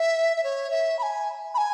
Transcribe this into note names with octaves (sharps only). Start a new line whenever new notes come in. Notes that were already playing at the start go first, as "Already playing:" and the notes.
Already playing: E5
E5
C#5
E5
B5
G#5
B5
G#5